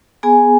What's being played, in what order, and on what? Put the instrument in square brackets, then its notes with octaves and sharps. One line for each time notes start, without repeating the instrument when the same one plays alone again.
[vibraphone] B3 G#4 G#5